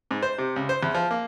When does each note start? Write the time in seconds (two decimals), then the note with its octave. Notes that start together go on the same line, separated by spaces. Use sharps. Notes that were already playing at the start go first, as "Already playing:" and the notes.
0.11 G#2
0.22 C5
0.38 C3
0.56 C#2
0.69 C5
0.83 E2
0.94 F3
1.11 A#3